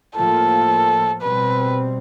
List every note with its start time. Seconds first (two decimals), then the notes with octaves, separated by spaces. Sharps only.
0.16 A2 F3 A#3 A4
1.22 B2 G3 C4 B4